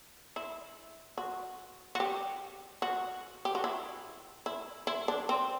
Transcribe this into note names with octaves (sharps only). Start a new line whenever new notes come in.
E4
F#4
F#4
G4
F#4
G4
F#4
E4
E4
E4
D4
C4